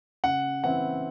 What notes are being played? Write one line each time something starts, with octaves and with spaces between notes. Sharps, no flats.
C#3 F#5
E3 C4 E4 F#5